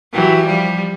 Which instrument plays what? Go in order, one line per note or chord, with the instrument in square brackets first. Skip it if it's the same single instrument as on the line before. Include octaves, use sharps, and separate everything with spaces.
[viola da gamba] E3 F#3 [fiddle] G4
[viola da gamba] F3 G3